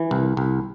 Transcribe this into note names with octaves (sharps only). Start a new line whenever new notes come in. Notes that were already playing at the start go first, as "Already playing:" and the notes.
Already playing: E3
C2
C2